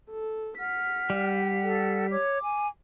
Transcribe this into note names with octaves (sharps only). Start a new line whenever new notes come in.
A4
F#5 F6 B6
G3
A4
C#5 D6
G#5